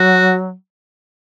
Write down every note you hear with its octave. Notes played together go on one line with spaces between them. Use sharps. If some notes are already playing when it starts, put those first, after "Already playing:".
Already playing: F#3 F#4